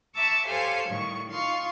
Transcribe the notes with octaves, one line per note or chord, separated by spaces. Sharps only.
E5 A5 A#5 C#6 D6 E6
G4 A4 C5 C#5 F5 G#5
A2 D#3 G3 C#6
D#4 F4 F5 C6 C#6